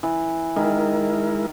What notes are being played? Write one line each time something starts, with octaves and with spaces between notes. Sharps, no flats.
E3
D#3 G#3 E4 A#4